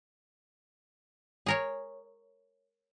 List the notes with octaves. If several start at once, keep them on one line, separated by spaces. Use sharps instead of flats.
G#4 A#4 C#5